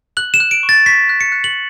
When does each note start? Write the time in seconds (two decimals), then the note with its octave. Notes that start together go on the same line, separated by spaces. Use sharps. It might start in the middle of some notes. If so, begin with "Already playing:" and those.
0.17 F#6 F#7
0.34 E7
0.40 F#6
0.51 D7
0.63 C#6
0.69 A6
0.86 C#6 B6
1.09 F#6
1.21 C#7
1.32 F#6
1.44 F#7